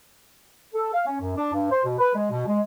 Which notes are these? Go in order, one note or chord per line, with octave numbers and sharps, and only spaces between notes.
A4
F5
C#4
F#2
D4
G2
C5
B2
B4
G#3
B2
G#3